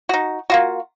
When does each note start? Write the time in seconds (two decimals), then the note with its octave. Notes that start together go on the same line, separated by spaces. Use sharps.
0.09 D#4 F#4
0.50 A#3 F4 F#4